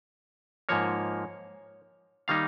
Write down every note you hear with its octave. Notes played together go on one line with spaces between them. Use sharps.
G#2 F3 A#3 C#5
D#3 G3 A#3 D#4 F5